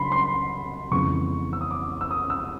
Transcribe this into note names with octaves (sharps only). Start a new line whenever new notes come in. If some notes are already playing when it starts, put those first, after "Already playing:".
Already playing: C#3 F#3 D4 B5 C6
C6
F2 C#3 E3 G#3 B3 C#6
E6
D#6
D6
E6
D#6
E6